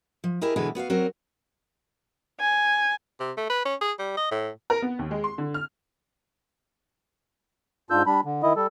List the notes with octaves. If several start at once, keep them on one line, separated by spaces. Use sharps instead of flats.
F3
E4 G4 G#4 A#4 D#5
B2 D3 E3 G#3 G#4 B4
B3 F#4 B4 F5
F#3 C4 F#4 A#4 C#5
G#5
C3
A3
B4
C#4
G#4
G3
D#5
A2
A#4
B3
D#2
G#3
C6
D3
F6
G#2 D4 F4 E6 G6
G3 D4 B5
D3
D#3 E4 D#5
G3 A4